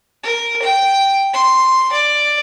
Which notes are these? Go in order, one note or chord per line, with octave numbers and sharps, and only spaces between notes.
A#4
G5
C6
D5